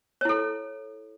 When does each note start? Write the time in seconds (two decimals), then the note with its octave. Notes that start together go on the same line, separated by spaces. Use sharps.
0.21 C#5
0.25 E4
0.29 A4